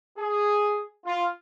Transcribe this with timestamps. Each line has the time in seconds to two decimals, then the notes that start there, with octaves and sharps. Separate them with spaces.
0.18 G#4
1.05 F4